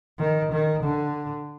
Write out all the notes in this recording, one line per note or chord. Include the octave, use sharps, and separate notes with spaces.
D#3
D#3
D3